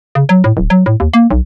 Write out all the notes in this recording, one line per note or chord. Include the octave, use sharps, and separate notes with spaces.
C#3
F#3
A2
D1
F#3
A2
D#2
A#3
B1